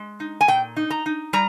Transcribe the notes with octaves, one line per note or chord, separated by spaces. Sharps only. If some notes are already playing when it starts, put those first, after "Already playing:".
Already playing: G#3
D#4
G#5
A#2 G5
D#4
A#5
D#4
G3 A#5